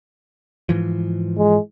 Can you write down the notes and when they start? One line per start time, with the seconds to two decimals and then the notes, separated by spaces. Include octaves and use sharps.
0.69 G#2 E3 F3
1.38 G#3